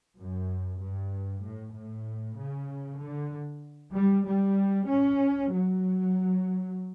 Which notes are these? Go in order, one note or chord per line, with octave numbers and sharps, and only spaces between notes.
F#2
G2
A2
A2
C#3
D3
G3
G3
C#4
F#3